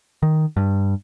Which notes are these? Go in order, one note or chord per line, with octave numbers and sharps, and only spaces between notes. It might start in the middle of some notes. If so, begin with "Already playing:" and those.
D#3
G2